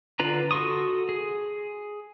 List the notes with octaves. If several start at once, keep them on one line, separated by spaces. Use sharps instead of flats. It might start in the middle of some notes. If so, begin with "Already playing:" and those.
D3 F4 B4 A#5
F#4 A4 C6 C#6 D#6
G#4